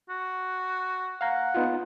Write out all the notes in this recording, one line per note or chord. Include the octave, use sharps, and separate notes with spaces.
F#4
F5 F#5 A#5
B3 D#4 F4